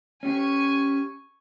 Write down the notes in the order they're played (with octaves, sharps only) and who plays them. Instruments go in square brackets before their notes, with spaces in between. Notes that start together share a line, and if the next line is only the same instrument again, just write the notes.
[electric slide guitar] C#4 G4 [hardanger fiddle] G#5 C#6